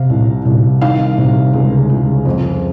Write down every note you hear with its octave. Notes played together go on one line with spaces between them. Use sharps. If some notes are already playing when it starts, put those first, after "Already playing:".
Already playing: C3 F5
C2
C2
D#3 F5
C3
C#2
C#2
F2